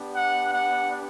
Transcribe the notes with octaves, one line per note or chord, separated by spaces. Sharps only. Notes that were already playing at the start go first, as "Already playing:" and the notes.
Already playing: B3 D4 G4
F#5
F#5